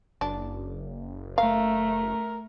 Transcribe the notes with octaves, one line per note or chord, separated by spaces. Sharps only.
F#1 D4
A3 A#4 F5